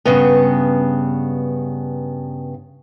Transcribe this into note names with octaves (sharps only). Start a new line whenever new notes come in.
G2 C#3 B3